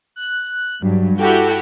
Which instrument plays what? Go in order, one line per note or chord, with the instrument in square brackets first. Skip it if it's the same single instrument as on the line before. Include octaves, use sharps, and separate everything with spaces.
[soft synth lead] F#6
[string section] G2 [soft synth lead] F#3
[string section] E4 F#4 G4 [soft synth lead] A4